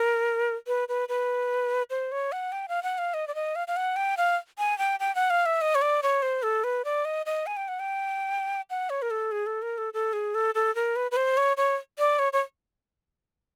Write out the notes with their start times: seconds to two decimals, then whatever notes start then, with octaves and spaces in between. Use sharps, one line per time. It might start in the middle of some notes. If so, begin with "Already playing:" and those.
Already playing: A#4
0.67 B4
0.89 B4
1.09 B4
1.90 C5
2.12 C#5
2.32 F#5
2.52 G5
2.68 F5
2.83 F#5
2.98 F5
3.14 D#5
3.28 D5
3.35 D#5
3.56 F5
3.68 F5
3.77 F#5
3.96 G5
4.17 F5
4.58 G#5
4.78 G5
5.00 G5
5.15 F#5
5.30 F5
5.46 E5
5.61 D#5
5.75 C#5
5.82 D5
6.03 C#5
6.22 C5
6.43 A4
6.64 B4
6.85 D5
7.05 D#5
7.26 D#5
7.47 G#5
7.57 G5
7.68 F#5
7.80 G5
8.70 F#5
8.90 C#5
9.02 A#4
9.11 A4
9.32 G#4
9.46 A4
9.62 A#4
9.78 A4
9.94 A4
10.13 G#4
10.35 A4
10.55 A4
10.75 A#4
10.96 B4
11.11 B4
11.16 C5
11.37 C#5
11.57 C#5
11.99 D5
12.19 C#5
12.33 C#5